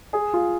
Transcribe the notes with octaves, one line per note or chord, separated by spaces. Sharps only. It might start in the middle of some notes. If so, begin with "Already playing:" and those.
G#4
F4